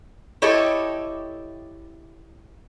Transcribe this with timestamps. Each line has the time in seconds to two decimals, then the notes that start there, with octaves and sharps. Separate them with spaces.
0.42 E4 G4 A4 C#5 D#5 E5